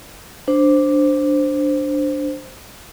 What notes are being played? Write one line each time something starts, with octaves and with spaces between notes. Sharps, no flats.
D4 C5